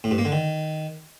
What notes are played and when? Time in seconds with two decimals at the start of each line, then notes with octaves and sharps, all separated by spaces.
0.04 A2
0.11 G2
0.18 A#3
0.25 D3
0.32 D#3